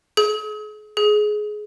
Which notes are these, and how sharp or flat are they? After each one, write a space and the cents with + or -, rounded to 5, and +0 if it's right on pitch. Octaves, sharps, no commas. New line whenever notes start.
G#4 +40
G#4 +20